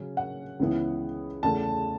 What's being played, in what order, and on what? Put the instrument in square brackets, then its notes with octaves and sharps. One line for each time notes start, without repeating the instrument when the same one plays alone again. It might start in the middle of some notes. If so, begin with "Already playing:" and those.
Already playing: [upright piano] C#3 F#3 C#4
F#5
C#2 C#3 E3 B3 E4
E2 C#3 A3 A5